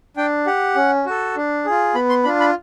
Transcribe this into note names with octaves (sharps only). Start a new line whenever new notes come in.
D4 G5
G4 F#5
C#4
F#4 A4
D4
F4 G#4
B3 B5
C6
D4 F4 B5
B5